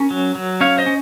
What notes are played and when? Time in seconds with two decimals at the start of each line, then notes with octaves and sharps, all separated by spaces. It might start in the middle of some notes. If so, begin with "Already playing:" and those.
Already playing: C#4 A#4 C#5
0.11 F#3
0.35 F#3
0.61 C#4 C#5 F5
0.78 C5 D#5
0.86 C#4